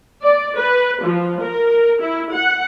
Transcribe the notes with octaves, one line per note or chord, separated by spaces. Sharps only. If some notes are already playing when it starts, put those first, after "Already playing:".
D5
B4
F3
A#4
E4
F#5